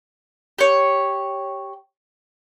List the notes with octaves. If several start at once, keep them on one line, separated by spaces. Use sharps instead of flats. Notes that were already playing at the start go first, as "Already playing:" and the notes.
G4 C#5